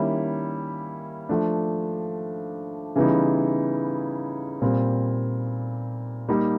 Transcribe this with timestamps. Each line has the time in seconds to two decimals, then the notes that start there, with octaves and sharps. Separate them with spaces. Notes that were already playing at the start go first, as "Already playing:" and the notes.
Already playing: D#3 G3 A#3 C#4 E4
1.29 F3 A3 D4
2.96 C#3 E3 G3 B3 D#4
4.62 A#2 G3 C4
6.29 G3 A#3 D#4